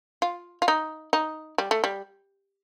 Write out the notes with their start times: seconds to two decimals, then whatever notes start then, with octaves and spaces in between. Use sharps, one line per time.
0.22 F4
0.62 F4
0.68 D#4
1.13 D#4
1.58 G3
1.71 A3
1.84 G3